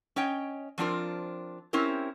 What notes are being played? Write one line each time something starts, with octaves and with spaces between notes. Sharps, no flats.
C#4 C#5 D#5 G5
F3 C4 D4 F4 A#4
C4 C#4 E4 G4 A#4